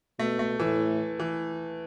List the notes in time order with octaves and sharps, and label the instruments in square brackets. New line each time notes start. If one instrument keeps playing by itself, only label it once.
[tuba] B2 [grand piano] A3
[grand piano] A3
[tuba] A2 [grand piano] E3
[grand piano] E3